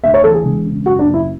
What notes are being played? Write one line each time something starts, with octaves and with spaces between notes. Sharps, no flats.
D2 E5
C#5
E3 A4
G#4
E1
C#3
F#2 F#4
D4
F#1
E4